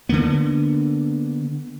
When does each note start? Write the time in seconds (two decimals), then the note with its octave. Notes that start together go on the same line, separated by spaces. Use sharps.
0.09 D3 D#3 A#3 B3